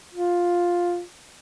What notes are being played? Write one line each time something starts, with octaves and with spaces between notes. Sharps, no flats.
F4